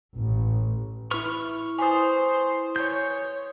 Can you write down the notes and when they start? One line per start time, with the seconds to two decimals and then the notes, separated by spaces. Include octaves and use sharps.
0.16 A1
1.11 E4 B4 C#6 F6
1.79 C5 G#5 D#6
2.76 C#5 G6